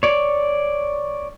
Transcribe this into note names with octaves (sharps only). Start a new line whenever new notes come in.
C#5 D5